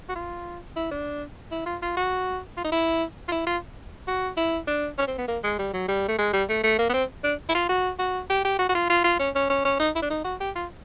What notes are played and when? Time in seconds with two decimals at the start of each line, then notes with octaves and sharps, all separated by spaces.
0.09 F#4
0.16 F4
0.76 E4
0.91 D4
1.51 E4
1.66 F4
1.82 F4
1.97 F#4
2.57 F4
2.64 D#4
2.72 E4
3.28 F4
3.32 E4
3.47 F4
4.08 F#4
4.37 E4
4.67 D4
4.98 C#4
5.07 C4
5.18 B3
5.28 A#3
5.44 G#3
5.59 G3
5.74 F#3
5.88 G3
6.08 A3
6.19 G#3
6.33 G3
6.49 A3
6.63 A3
6.79 A#3
6.89 B3
6.93 C4
7.24 D4
7.49 E4
7.55 F4
7.69 F#4
7.99 F#4
8.30 G4
8.45 G4
8.59 F#4
8.69 F#4
8.75 F4
8.90 F4
9.04 F4
9.19 C#4
9.35 C#4
9.50 C#4
9.65 C#4
9.80 D#4
9.95 E4
10.02 D4
10.10 D#4
10.25 F#4
10.40 G4
10.56 F4